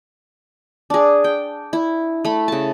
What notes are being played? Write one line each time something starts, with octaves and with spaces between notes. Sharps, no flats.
D4 G#4
G5
E4
A3 B5
C#3 A5